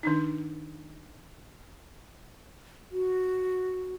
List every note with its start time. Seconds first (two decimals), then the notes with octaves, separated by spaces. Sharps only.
0.03 D#3 D4 D#4
2.92 F#4